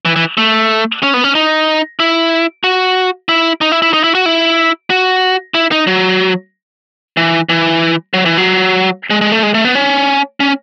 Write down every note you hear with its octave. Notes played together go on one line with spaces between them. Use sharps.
E3
E3
A3
C#4
B3
C#4
D#4
E4
F#4
E4
D#4
E4
E4
D#4
E4
F#4
E4
F#4
E4
D#4
F#3
E3
E3
F#3
E3
F#3
G#3
G#3
A3
G#3
A3
B3
C#4
C#4